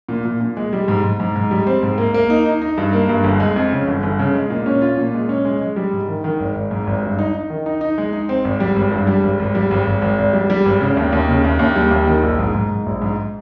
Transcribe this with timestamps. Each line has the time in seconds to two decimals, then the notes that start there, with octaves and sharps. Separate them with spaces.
0.09 A#2
0.25 A#2
0.40 A#2
0.57 G#3
0.73 G3
0.88 G#2
1.04 G#2
1.20 G#2
1.36 G#2
1.51 G3
1.67 C4
1.83 G#2
1.98 A#3
2.14 A#3
2.30 D#4
2.46 D#4
2.62 D#4
2.78 G2
2.93 A#3
3.09 G2
3.24 G1
3.40 G#3
3.56 F2
3.72 C#3
3.87 G1
4.03 G1
4.19 C#3
4.35 G#3
4.50 A#2
4.66 C#4
4.82 F4
4.97 A#2
5.14 G#3
5.29 C#4
5.45 G#3
5.61 G#3
5.76 G3
5.93 G#2
6.08 D#3
6.24 D#3
6.40 G#1
6.55 G#1
6.71 G#2
6.87 G#1
7.02 G2
7.19 D#4
7.34 D#4
7.50 D#3
7.66 D#4
7.81 D#4
7.98 G#3
8.13 D#4
8.29 C4
8.45 G#1
8.60 G3
8.76 G#1
8.92 G2
9.07 G3
9.23 G#1
9.40 G#1
9.55 G3
9.71 G#1
9.87 G#1
10.02 G#1
10.18 G#1
10.33 G3
10.50 G3
10.66 G#1
10.81 C#3
10.97 D#2
11.12 D#2
11.28 C#3
11.44 D#2
11.59 D#2
11.76 G3
11.91 D#2
12.07 D#3
12.23 A#1
12.39 G#2
12.54 G#2
12.70 G#2
12.86 A#1
13.02 G#2